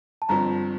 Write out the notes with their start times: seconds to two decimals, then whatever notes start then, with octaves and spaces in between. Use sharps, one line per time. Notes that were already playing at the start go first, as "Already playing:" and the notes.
0.22 A5
0.29 G1 G2 F3 C4 A#5